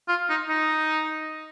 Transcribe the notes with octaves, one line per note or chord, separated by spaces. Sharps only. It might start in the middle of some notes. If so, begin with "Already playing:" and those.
F4
D#4
D#4